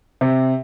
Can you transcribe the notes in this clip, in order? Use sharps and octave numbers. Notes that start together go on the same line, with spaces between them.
C3